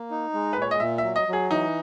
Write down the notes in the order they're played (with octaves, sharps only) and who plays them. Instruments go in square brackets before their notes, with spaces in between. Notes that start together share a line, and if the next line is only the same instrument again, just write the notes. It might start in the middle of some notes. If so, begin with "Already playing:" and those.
Already playing: [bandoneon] A#3
D#4
G#3
[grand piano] B4
[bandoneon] A#2 [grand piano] C#5
[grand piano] D#5
[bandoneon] A#2 [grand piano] E5
[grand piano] E5
[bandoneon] F#3
[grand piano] D#5
[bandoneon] F#3
[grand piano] G#4
[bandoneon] E3 [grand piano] D#4